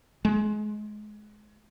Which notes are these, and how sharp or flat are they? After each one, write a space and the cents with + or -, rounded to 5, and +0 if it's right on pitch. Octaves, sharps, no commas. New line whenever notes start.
G#3 +25